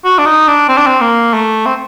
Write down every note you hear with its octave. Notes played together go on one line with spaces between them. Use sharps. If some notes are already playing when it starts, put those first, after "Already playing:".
F#4
D4
D#4
D4
C4
D4
C4
A#3
A3
C4